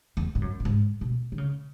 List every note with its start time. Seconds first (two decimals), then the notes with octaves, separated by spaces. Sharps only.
0.17 E2
0.35 G#2
0.42 F#2
0.60 A2
0.65 G#2
1.01 B2
1.32 D#3
1.38 C#3